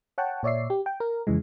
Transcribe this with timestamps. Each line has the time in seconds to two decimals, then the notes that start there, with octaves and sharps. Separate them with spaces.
0.18 C#5 F#5 G5 A5
0.43 A#2 C#5 D5 E5 C7
0.70 G4
0.86 G5
1.00 A#4
1.27 F2 C#3 E3 G#3